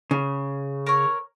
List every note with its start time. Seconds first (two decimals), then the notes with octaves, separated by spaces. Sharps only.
0.11 C#3
0.87 A#4 C#5